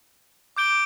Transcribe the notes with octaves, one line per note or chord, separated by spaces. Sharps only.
D6 G6 D7 G7